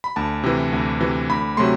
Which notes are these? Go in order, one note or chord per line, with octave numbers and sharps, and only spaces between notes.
B5
D2 A5
C3 E3
D2
C3 E3
D2 B5
C3 F#3 A3 C6